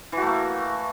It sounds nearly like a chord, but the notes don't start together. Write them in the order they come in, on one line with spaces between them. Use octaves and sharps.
E3 F#4 A3 A#3